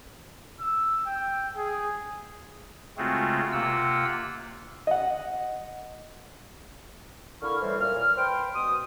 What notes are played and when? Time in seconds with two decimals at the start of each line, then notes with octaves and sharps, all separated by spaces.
0.60 E6
1.06 G5
1.56 G#4
2.97 C#3 G#3 A3 C4 F4 F#4
3.52 C3 A#3 F4 F#5 E6
4.87 D#5 F#5
7.42 D3 A#3 E4 C#6 F6
7.62 A2 E3 G3 C5 C#5
7.79 A#2 F6
8.17 B4 C5 G5 C6
8.55 B2 D#6